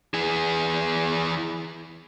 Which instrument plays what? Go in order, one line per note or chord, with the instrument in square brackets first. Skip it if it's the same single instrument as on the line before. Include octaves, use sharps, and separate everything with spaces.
[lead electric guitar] E3 G#4